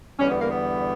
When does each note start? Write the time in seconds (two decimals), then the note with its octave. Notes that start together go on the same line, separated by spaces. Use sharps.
0.19 E2 D3 G3 C#4
0.29 B3
0.39 A#3
0.49 B3